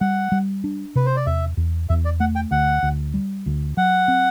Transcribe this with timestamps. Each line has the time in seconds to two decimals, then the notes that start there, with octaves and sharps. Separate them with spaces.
0.01 G3 F#5
0.32 G3
0.64 D4
0.95 C3 B4
1.06 C5
1.16 D5
1.26 E2 E5
1.57 E2
1.89 E2 E5
2.05 D5
2.20 A3 F#5
2.35 G5
2.51 D2 F#5
2.83 D2
3.14 G3
3.46 D2
3.77 F#3 F#5
4.08 C4